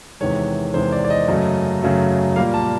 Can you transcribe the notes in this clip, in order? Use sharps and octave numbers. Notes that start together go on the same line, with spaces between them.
E2 C3 D#3 G#3 C#5
E2 C3 D#3 G#3 C5
D5
D5
D#5
F#2 C#3 F#3 A3
F#2 C#3 F#3 A3
A#2 G3 A#3 F5
A5